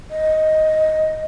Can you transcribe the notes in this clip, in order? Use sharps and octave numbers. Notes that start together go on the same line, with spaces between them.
D#5